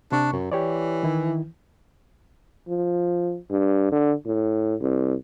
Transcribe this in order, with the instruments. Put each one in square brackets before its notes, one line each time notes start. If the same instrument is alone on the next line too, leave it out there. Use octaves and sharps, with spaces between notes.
[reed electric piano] C3 C#6 [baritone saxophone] D4
[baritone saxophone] F#2
[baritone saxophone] E3 [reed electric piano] G4 C#5 D5
[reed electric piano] D#3 E4
[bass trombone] F3
G2
D3
A2
C2